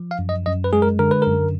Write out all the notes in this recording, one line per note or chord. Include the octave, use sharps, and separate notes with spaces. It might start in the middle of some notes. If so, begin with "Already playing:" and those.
Already playing: F3
F5
F#2
D#5
F#2 D#5
B4
G#3 G#4
A#4
D3 A#4
B4
F#2 A#4